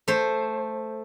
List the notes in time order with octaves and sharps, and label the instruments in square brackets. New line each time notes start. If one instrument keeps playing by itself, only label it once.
[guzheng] A3 C5